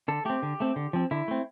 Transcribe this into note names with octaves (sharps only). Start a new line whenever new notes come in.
D3 A4
A3 C4 G4
D3
A3 C4
D3
F3 C4
D3 E4
A3 C4